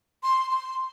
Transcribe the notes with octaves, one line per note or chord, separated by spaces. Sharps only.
C6
C6